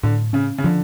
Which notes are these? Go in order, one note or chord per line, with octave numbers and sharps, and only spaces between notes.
A2 D3
C#3 C#4
C#3
D3 F3